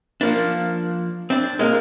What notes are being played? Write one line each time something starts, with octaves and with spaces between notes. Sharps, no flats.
F3 A#3 D4
C4 D4
G#3 A#3 G#4 A#4